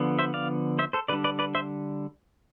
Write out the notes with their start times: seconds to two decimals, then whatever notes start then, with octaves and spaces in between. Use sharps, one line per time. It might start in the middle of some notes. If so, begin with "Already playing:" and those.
Already playing: D3 F3 B3
0.19 C5 E5
0.34 D5 F5
0.79 C5 E5
0.93 A4 C5
1.08 D3 G3 D4 B4 D5
1.24 B4 D5
1.39 B4 D5
1.55 C5 E5